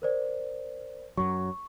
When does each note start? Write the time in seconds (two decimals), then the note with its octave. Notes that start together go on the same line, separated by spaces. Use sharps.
0.02 A#4 C5 D5
1.17 F#2 F#3 C#6